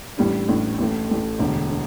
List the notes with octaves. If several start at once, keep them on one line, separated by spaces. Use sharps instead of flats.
A1 A2 G3 D4
A1 A2 G3 D4
A1 A2 A3
A1 A2 A3
E1 D2 D3
D3